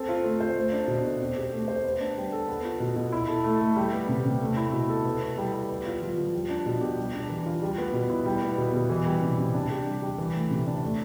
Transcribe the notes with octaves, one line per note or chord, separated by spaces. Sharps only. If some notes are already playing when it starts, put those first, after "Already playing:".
Already playing: C4 A4
F4
A3
C5
A3
D4
B2
A4
C4
G4
A3
C5
B3
D4
G3
A4
B3
F4
B2
B2
E4
A4
A3
A3
G3
B3
C3
C3
A3
E4
B2
A4
B3
E4
G3
G3
B3
F4
F3
F3
G3
D4
B2
G4
G3
D4
E3
F4
G3
B3
B2
E4
G3
B3
B2
B2
E3
G3
C3
C3
D4
G4
G3
G3
E3
A3
C3
D4
A3